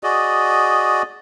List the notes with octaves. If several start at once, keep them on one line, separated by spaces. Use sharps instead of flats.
F#4 G#4 D5 D#5